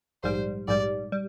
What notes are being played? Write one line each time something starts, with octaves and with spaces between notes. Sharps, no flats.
A#1 G#2 G3 C5
A#1 G#2 G3 D5
G3